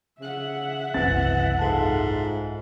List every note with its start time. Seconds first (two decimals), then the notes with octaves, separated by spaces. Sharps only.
0.20 C#3 E5 F#5
0.94 F#1 C2 E3 C4 A6
1.59 G#2 F4 A4 A5